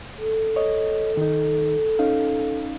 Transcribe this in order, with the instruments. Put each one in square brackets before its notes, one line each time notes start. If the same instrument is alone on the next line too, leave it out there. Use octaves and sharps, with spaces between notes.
[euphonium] A4
[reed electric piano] C#5 D#5
D#3 D#4
C#4 D#4 F5